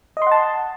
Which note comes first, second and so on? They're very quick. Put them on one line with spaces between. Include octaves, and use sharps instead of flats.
D#5 C6 F#5 A5